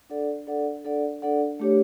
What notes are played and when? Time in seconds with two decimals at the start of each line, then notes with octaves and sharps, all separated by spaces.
0.10 D4 A4 D5 F#5
0.47 D4 A4 D5 F#5
0.85 D4 A4 D5 F#5
1.22 D4 A4 D5 F#5
1.60 A3 D4 G4 C#5